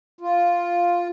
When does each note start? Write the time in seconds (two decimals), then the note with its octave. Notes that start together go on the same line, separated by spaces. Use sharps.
0.21 F4